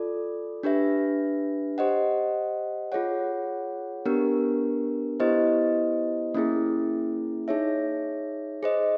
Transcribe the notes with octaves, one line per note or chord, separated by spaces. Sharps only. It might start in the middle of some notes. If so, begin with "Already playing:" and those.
Already playing: F4 A4 D5
D4 G4 B4 E5
G4 C5 D#5 F#5
F4 G#4 C#5 F#5
B3 D4 G4 A#4
B3 E4 G4 C5 D#5
A#3 C#4 E4 G#4
D#4 G#4 C#5 E5
G#4 C5 D#5